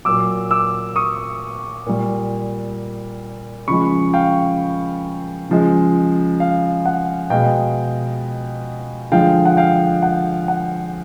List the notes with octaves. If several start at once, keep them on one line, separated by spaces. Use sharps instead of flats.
A#2 F#3 D6 E6
D6 E6
C#6 D#6
A#2 G3
C#3 F3 G#3 B5 C#6
F5 G5
C#3 F3 G#3
F5
F#5
B2 G#3 F5 G5
D3 F3 G#3 F5 G5
F#5
F5 G5
F#5
F#5